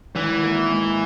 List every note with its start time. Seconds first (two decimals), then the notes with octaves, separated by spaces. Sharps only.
0.15 G#1 E3
0.43 A#3
0.71 G#2